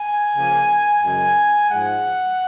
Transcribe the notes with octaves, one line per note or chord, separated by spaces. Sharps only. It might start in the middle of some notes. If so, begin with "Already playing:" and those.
Already playing: G#5
C#3 F3 A#3
F#2 C#3 G#3 G#5
G#2 F3 G#3 F#5